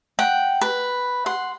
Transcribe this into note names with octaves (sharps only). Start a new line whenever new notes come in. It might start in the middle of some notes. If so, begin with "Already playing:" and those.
F#5 G5
B4
F#5 C6